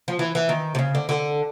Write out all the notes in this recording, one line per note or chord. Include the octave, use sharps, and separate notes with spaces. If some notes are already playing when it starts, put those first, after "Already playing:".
F3
E3
E3
D#3
C3
C#3
D3
D3